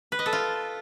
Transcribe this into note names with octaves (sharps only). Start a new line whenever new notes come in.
B4
D#5
A4
F4